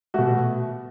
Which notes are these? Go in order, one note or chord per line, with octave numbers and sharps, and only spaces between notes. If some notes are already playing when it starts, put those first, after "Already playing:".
B2 A3 F#4